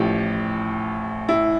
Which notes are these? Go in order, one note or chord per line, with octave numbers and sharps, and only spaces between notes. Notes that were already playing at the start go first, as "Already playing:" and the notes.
Already playing: A1 A2 F3 G4
E4